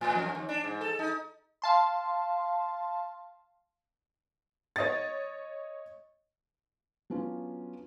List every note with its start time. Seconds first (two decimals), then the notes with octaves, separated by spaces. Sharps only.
0.01 A2
0.15 F2
0.35 D#2
0.49 D4
0.64 G#2
0.81 A4
0.99 D#4
1.62 F5 A5 C6
4.76 C#5 D#5 A6
7.10 F#3 B3 C#4 D4 F4